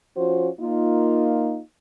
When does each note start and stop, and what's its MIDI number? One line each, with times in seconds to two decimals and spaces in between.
0.17 0.49 53
0.17 0.49 61
0.17 0.49 65
0.17 0.49 66
0.17 0.49 72
0.60 1.60 58
0.60 1.60 63
0.60 1.60 65